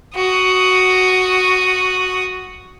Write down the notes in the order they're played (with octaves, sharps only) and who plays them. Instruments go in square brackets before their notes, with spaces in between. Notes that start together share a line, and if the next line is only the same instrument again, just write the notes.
[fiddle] F#4 D#6